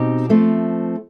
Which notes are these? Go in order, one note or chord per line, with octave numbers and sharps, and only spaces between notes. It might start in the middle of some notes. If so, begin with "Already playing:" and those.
Already playing: B2 C4 D#4 G4
F3 A3 C4